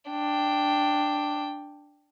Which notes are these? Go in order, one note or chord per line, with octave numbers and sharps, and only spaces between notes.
D4 G5